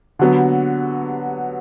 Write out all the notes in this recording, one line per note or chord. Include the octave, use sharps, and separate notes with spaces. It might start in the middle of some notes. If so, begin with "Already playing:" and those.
D3 F#3 B3